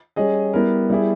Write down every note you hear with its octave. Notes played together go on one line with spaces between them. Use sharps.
G3 C#4 G#4 D#5
G3 B3 E4 A#4
G3 B3 E4 G#4